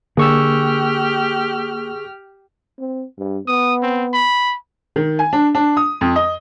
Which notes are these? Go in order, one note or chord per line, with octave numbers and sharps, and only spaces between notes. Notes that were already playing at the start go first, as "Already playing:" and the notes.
D3 A#3 G4 G#4 C#6 E6 F6
C4
G2
B3 D#6
C4
B5
D#3
G#5
D4
D4
D#6
F2
D#5